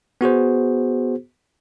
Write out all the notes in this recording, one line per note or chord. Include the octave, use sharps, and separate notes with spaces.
B3 F#4 G#4 C5